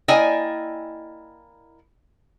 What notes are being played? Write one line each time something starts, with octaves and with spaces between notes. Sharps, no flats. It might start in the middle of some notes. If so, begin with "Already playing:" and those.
A#3 E4 D5 D#5 G5 G#5